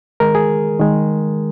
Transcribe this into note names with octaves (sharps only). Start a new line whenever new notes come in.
D#3 G#3 A#4
G#4
D#3 G#3